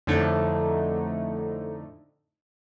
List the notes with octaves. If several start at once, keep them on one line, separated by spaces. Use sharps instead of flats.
F2 A2 D3 A3 D#4